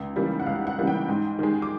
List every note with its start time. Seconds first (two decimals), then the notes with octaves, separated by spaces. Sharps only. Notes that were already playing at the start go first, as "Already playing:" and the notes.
Already playing: C#2
0.16 C#3 E3 G3 A#3
0.40 F#5
0.46 C#2 F5
0.67 F#5
0.78 C#3 E3 G3 A#3
0.87 G5
1.08 G#2
1.39 D#3 G#3
1.62 D6